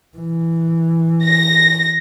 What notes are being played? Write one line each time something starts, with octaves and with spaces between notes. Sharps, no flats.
E3
A#6